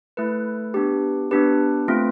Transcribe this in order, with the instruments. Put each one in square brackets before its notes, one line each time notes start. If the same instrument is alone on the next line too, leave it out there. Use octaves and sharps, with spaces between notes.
[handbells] A3 E4 A4 B4
B3 D4 G4
B3 D4 G4 B4
A3 C4 F4